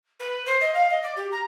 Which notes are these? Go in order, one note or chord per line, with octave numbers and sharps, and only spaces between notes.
B4
C5
D#5
F5
D#5
D5
G4
A#5